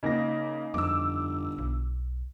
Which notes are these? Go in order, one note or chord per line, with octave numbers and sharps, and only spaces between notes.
C#3 A#3 D#4 A#6
G1 F2 D6 E6
B1